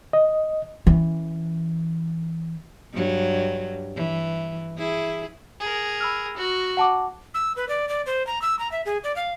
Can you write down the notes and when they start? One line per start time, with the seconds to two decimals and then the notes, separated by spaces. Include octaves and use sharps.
0.13 D#5
0.87 E3 C#4
2.93 G2 F#3
3.96 E3
4.77 E4 G#4
5.60 G#4 A#4
6.00 B5 E6 F6
6.37 F#4
6.77 F#5 A5 D6
7.34 E6
7.56 B4
7.69 D5
7.89 D5
8.06 C5
8.27 A#5
8.42 E6
8.59 A#5
8.72 E5
8.86 G#4
9.04 D5
9.16 F5